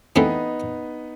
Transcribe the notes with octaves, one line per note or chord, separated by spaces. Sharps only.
E3 A3 B3 C4 D#4 E4 G4